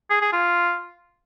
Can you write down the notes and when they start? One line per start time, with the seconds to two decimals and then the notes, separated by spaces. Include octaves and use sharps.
0.10 G#4
0.22 G#4
0.33 F4